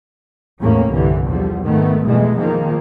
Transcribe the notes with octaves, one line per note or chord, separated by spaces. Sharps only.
E2 A2 A#3 C#4
C2 G2 D3 E3 G3
E2 D3 F3 G3
G#1 D#3 A3 B3
F2 B2 E3 G#3 A3
D#3 F3 G#3 A#3